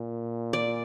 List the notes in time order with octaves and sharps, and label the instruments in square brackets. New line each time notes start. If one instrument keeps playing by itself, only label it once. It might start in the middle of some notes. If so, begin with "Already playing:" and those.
Already playing: [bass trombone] A#2
[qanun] D5